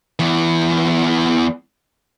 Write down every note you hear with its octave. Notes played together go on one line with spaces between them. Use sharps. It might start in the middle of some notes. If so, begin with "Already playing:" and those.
E2 E3